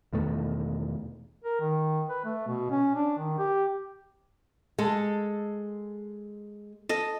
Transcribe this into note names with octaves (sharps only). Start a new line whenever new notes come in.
E2 B2 D#3 A3
A#4
D#3
B4
A3
B2
C#4
D4
D#3
G4
G#3 A4
A4 D#5